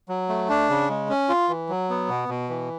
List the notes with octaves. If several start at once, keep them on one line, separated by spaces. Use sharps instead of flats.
F#3
A3
D4
C#3
G#3
C#4
F4
E3
F#3
B3
B2
B2
E3